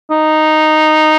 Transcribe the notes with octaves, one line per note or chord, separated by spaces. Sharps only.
D#4